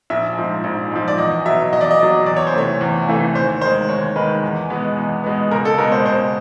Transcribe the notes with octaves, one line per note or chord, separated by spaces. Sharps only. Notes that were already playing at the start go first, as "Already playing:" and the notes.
A#1 E5
G#2 F3
A#1
G#2 F3
D5
E2 D#5
B2 F#3 E5
E2 D#5
D5
D#5
B2 F#3 D5
E2 D5
C#5
C5
C3 E3 A3 C#5
E2
C3 E3 A3
D#2 C5
D#3 G#3 C5
D#2 C#5
D#3 G#3 B4
E2
B2 G#3 B3
E2
B2 G#3 B3
C#2 A#4
A4
B2 G#3 B3 A#4
C5
C#2 C5